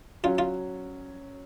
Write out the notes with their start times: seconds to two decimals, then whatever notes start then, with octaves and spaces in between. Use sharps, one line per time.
0.24 F#3 C#4 F4 F#4
0.38 F4